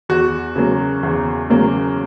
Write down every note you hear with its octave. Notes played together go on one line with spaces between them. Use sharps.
E2 F#4
C#3 F#3 A#3
E2
C#3 F#3 A#3